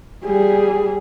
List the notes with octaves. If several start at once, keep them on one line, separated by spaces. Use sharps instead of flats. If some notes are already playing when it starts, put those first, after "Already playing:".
G3 G#4